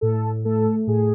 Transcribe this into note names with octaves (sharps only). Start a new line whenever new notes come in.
A2 A4
A3 A4
A2 G#4